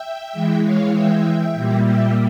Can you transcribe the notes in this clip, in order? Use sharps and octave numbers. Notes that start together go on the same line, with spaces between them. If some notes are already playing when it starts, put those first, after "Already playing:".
Already playing: E5 G5
E3 G#3
C#5 F5
E5 G5
A#2 G3 A#3
E5 G5